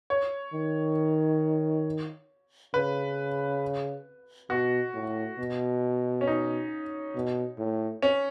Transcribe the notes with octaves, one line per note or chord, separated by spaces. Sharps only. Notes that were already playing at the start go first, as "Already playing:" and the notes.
C#5
D#3
C#3 B4
B2 F#4
A2
B2
C#4
D#4
B2
A2
C#4